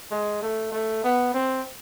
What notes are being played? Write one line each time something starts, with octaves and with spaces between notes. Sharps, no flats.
G#3
A3
A3
B3
C4